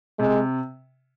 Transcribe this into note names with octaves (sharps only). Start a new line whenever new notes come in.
C3 G#3